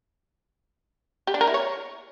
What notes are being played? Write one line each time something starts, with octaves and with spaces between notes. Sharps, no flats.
G4
D4
A#4
E4
C#5